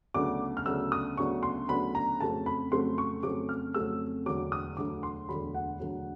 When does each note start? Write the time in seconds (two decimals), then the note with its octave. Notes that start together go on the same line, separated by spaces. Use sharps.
0.14 D2 C#3 F#3 B3 D4 D6
0.57 F6
0.66 D2 C#3 F#3 B3 D4 E6
0.92 D#6
1.17 D2 C#3 F#3 B3 D4 C#6
1.43 C6
1.69 D2 C#3 F#3 B3 D4 B5
1.95 A#5
2.20 F2 C#3 F#3 A3 C4 A5
2.46 B5
2.71 F2 C#3 F#3 A3 C4 C6
2.98 C#6
3.23 F2 C#3 F#3 A3 C4 D6
3.49 F6
3.74 F2 C#3 F#3 A3 C4 E6
4.26 E1 D2 D3 F#3 D6
4.52 D#6
4.77 E1 D2 D3 F#3 D6
5.03 C6
5.29 E1 D2 D3 F#3 B5
5.54 F#5
5.80 E1 D2 D3 F#3